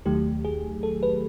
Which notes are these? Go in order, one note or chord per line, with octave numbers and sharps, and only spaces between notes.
D#2 D#3 F#3 A3 G4
G#4
A4
B4